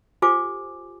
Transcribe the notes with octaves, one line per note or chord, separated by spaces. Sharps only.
F4 G4 A4 C5 G#5 D6